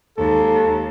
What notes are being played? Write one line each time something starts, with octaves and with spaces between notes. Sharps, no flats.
D#2 G#3 A4